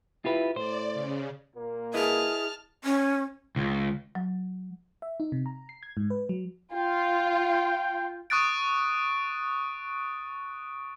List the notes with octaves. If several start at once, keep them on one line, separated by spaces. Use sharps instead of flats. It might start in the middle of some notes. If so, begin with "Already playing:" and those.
E4 F4 G4 B4
A2 C5 D5
C#3
A#2 A#3
E4 G#4 B4 D#5 A5 F6
C#4
C#2
F#3
E5
D#4
C3
A#5
C7
G#6
G#2
B4
F#3
F4 G5
C#6 D#6 F#6 A6 D7